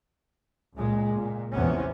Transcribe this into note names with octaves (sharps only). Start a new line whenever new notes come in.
C#2 A#2 G#3
A#2
A#1 E2 C3 B3 C#4